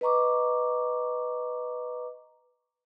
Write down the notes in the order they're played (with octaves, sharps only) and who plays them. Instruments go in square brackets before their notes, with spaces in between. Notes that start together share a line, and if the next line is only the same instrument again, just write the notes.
[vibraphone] B4 D#5 A#5 C#6 D6